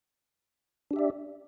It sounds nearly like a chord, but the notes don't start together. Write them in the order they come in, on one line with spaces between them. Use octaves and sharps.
D4 G4 E5 D5